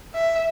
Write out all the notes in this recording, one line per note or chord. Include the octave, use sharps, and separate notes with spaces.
E5